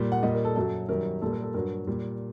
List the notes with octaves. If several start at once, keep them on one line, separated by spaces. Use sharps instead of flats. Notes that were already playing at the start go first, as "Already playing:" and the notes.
Already playing: A#2 G3
F#5
A#2 G3 D#5
A#4
A4
F#2 F#3 A4
F#2 D#3 G3 A#4
A#2 G3 A4
A#4
A4
G2 F#3 A#4
A#2 G3